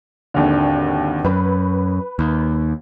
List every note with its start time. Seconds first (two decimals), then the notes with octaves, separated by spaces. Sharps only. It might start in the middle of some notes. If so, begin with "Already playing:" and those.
0.34 G#1 D#2 D3
1.25 F#2 B4
2.19 D#2